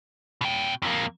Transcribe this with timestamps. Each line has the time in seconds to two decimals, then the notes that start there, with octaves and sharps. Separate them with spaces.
0.41 B2 G5
0.82 F2 A#3